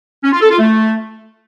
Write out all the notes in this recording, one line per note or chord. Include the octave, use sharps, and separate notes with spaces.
C#4
F4
A4
F4
A3